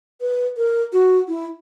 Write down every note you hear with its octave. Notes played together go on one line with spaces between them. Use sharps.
B4
A#4
F#4
E4